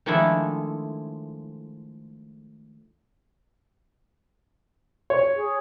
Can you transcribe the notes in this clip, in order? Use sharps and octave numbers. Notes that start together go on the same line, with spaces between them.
D#3 F3 G#3 A3 D4 E4
C#5
G#4